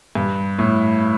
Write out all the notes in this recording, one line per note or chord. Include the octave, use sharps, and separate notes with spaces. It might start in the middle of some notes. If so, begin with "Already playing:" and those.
G2
A2